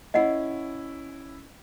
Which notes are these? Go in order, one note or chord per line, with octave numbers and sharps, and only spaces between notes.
C#4 E4 D#5 F#5